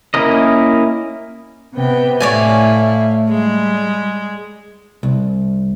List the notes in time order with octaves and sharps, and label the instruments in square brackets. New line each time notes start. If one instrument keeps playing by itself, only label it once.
[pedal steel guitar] A#3 C#4 E4 A#4 D#5
[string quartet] C3 B3 G5
[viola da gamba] A2 E4 [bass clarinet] A3 [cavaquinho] C#5 D5 G#5 [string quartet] F5
[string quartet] G3 [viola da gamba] G#3
[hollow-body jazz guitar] C2